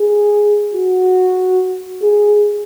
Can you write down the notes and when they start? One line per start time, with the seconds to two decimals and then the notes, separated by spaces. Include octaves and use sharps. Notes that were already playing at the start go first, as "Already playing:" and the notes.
Already playing: G#4
0.74 F#4
2.02 G#4